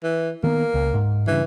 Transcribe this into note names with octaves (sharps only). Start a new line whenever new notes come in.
E3
D#3 A#3 B3
C#2
G#2
G2 C#3 E3